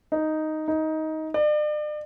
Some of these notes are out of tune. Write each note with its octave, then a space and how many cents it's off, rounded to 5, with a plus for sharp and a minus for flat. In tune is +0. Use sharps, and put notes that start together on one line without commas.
D#4 +0
D#4 +15
D5 +40